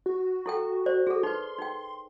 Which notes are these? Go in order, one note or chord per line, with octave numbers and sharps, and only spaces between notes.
F#4
E4 A4 G5
C5 D5
F#4 G#4 A4
D#4 B4 C6
D#4 G5